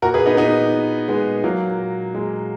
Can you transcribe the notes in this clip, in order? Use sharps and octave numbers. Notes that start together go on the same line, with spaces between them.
A#2 F#4 A#4
G#4 B4
B3 D#4
A#2 B3 D#4
A#2
A#2 G#3 B3
A#2 F#3 A#3
A#2
A#2 G#3